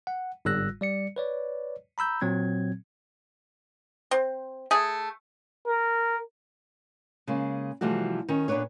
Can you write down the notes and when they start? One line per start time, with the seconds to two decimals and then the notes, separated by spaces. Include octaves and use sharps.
0.07 F#5
0.45 G1 G#2 G3 E6 F#6 A#6
0.81 G3 D5 C#7
1.16 B4 C#5 D5
1.98 A#5 B5 E6 G6
2.21 A#2 F#3 C4 G#6
4.11 C4
4.71 A3 G#4
5.68 A#4
7.27 C#3 G#3 A#3
7.81 C3 E3 F3 G3 A3 F#4
8.28 D#3 C#4
8.48 A#2 B3 D4 B4 C#5